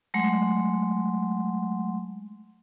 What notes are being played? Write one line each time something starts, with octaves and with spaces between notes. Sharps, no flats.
F#3 G#3 A3 F#5 C6